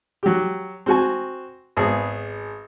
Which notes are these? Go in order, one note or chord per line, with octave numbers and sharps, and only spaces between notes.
F#3 G4
C4 F#4 G#5
G#1 B3 G#4